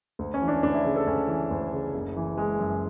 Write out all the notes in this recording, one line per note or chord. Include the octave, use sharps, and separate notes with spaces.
D2
C#4
E3
D4
D2 D4
E4
C#3
A4
D2 C#4
E3
D2
C#3
F#1
E3
G#3
F#2